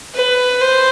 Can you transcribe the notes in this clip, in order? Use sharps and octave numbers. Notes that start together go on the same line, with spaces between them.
B4
C5